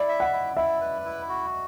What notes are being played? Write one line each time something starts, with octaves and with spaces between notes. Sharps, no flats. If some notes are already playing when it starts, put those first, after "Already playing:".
Already playing: E4 D5
E5
F#5
E4
E4 E5
B4
E4
F#4